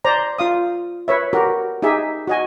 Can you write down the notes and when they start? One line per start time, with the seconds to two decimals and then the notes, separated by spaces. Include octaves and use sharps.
0.05 C5 D5 A#5
0.39 F4 F5 D#6
1.08 B4 C#5 E5
1.33 F#4 G4 A#4
1.82 D#4 G4 G#4 E5
2.27 F#4 D#5 G#5